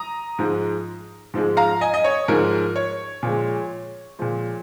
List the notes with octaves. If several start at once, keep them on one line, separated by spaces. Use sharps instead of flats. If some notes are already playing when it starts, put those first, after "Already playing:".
Already playing: A#5 D#6
G#2 F3 G#3
G#2 F3 G#3
F5 A#5
D#5 G#5
D#5
C#5
G#2 F3 G#3 A#4
C#5
A#2 F3 G#3
A#2 F3 G#3